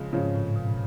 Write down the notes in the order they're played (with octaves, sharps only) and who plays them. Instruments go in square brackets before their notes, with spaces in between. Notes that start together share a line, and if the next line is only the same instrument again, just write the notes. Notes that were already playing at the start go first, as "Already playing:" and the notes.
Already playing: [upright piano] C#3 F3 G#3
[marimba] G#2 [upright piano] C#3 F3 G#3 C#4
[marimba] A2
B2